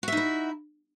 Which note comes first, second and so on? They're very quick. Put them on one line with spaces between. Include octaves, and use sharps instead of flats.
F#4 E5 D#4 E4